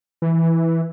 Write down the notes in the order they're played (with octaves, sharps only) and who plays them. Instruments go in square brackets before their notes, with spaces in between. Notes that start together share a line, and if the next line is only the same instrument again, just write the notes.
[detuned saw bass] E3